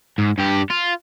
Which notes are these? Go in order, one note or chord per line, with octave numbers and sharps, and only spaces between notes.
G#2
G2 G4
F4